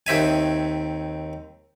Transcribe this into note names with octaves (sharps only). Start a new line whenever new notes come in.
D#2 C4 E5 G#5